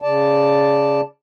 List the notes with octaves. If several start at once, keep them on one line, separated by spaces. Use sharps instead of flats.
C#3 D5 A5